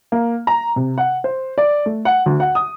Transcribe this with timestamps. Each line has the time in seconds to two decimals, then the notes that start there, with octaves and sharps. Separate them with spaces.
0.12 A#3
0.47 A#5
0.76 C3
0.98 F#5
1.24 C5
1.58 D5
1.86 A3
2.05 F#5
2.26 D2
2.40 F#5
2.55 D#6